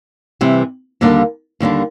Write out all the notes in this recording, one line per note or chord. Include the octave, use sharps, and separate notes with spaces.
C3 E3 G3
D#2 D3 G3 A#3 D4
D#2 D3 G3 A#3 D4